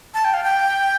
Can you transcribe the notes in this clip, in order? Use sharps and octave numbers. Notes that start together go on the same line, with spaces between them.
A5
G5
F5
G5